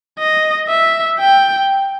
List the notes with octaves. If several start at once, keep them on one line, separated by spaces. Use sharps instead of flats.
D#5
E5
G5